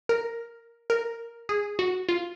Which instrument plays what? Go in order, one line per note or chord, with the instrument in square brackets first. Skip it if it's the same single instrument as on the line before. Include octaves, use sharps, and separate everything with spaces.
[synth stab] A#4
A#4
G#4
F#4
F4